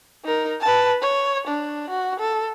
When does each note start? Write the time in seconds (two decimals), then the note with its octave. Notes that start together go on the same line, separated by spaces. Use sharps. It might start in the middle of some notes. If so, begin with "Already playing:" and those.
0.25 D#4 A#4
0.60 B4 A5
1.02 C#5
1.47 D4
1.90 F#4
2.20 A4